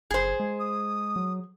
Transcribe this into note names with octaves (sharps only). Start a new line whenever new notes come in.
F#1 G#4 C5
G#3
D#6
F#3